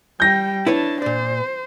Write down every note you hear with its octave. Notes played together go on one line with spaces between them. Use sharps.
G3 G5 G6 A#6
D4 E4 B4 C#5 A5
A#2 C5 D5